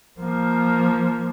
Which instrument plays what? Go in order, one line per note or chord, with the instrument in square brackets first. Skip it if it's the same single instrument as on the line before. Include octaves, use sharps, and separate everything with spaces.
[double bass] F3 A#3